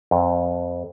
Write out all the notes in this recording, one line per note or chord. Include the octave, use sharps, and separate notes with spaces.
F2